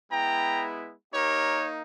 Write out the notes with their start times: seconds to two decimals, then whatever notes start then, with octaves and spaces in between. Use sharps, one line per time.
0.11 G#3 B3 E4 G5 A#5
1.14 A#3 D#4 G4 A#4 C#5